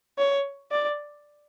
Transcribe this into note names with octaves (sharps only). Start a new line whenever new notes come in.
C#5
D5